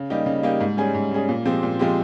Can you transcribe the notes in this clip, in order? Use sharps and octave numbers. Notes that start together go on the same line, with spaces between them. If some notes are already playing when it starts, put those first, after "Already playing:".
Already playing: C#3
G3 A#3 D#4 G4
C#3
G3 A#3 D#4 G4
G#2
G3 C#4 G#4
G#2
G3 C#4 G#4
A#2
F3 G#3 C4 G4
A#2
F3 G#3 C4 G4